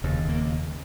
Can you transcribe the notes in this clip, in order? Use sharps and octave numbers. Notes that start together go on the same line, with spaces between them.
E1 D#2 C#3
A#3